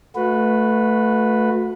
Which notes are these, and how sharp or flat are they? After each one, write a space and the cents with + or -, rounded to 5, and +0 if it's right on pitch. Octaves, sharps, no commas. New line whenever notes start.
A3 +0 F#4 -30 B4 +0